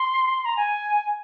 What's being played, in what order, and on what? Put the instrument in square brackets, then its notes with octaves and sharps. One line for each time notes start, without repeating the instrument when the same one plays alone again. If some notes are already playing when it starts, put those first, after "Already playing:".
Already playing: [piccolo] C6
A#5
G#5